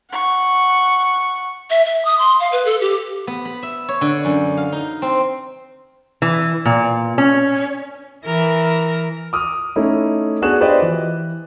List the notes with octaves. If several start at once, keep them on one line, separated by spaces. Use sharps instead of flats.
F#5 C#6
E5
E5
D#6
C6
F5
B4
A4
G4
B3
B5
E5
C#5
D3
F#2
F5
D#4
C4
E3
A#2
C#4
E3 A#4
D6 D#6 F6
A3 C#4 D#4 E4
B3 D4 F#4 G#4 F#6 E7
F4 G4 B4 C5 D5 D#5
E3